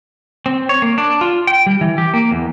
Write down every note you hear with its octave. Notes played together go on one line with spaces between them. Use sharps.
C4
C#5
A#3
D4
F4
G5
G3
E3
G4
A#3
E2